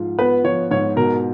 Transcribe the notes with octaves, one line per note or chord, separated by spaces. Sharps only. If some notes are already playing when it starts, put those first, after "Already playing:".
Already playing: G#2 F3 F4
B3 B4
F3 C#5
G#2 C#5
B2 A#4